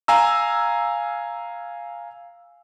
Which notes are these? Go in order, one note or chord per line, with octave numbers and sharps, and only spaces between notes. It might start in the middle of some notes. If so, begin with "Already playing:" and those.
F5 G#5 A#5 E6